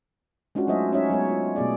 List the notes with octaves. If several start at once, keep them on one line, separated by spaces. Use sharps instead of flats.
G#3 C#4 D4 F4 F#4
F#3 A3 D#4 C5 D#5 E5
G#3 C#4 D#4 C#5 E5
F#3 G#3 B3 C#5
F4
B2 A3 B3 G#4 D5